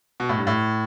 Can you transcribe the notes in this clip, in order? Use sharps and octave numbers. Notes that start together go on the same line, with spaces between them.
B2
A2
G2
A2